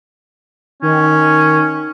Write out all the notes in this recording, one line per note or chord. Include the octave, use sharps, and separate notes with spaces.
D#3 C#4